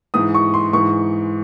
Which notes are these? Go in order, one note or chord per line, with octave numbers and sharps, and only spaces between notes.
G#2 E3 D#6
C#6
C6
G#2 E3 C#6